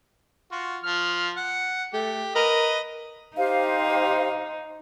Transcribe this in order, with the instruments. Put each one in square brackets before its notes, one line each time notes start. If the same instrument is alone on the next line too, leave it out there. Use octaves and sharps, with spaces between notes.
[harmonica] F4 F#4
F3 F6
F#5
[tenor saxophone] A3 [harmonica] G4
[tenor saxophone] A#4 [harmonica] B4 D#5
[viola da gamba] D#4 [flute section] G4 C5 F5